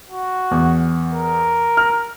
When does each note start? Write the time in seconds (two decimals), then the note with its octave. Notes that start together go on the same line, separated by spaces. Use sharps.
0.10 F#4
0.51 E2
1.12 A#4
1.77 F6